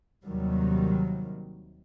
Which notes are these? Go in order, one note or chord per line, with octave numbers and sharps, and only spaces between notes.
D#2 C3 D#3 F#3 G3